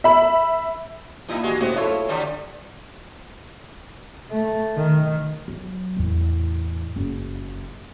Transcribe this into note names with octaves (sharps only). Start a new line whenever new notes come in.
E5 B5
G2 A#2 D#4 E4
E3 G#3 F#4 G4
A2 C#3 B3 C4 F#4 C5
E4 F4 A4 C#5
D3 E3 G3
A3
D#3
F#3
E2 A2
F#1